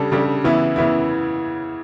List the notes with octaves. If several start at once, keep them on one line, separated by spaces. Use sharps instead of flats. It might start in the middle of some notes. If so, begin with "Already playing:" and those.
Already playing: C#3 G3 D4 A4
C#3 G3 D4 A4
C#3 E3 B3 E4
C#3 E3 B3 E4